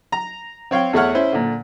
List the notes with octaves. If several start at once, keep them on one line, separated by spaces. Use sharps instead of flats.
A#5
C4 C#5 F5 G5
E2 A3 E4 C#5 F#5 F6
C#4 E4 C5
A#2 D3